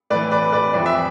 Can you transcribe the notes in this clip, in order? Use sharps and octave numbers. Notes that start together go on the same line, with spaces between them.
A2 E3 B4 D5
B4 D5
B4 D5
F2 E3 D5
E5